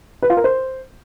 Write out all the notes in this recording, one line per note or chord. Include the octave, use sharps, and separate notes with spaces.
B4
F4
A#4
C5